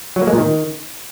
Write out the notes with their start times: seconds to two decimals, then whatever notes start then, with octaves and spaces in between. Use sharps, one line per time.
0.16 F#3
0.22 A#3
0.27 G#3
0.33 A#2
0.38 D#3